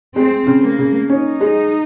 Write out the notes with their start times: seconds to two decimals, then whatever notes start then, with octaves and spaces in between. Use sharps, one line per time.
0.16 G#3 C4
0.47 C#3
0.62 A#3
0.79 C#3
1.10 C#4 D#4
1.41 G#3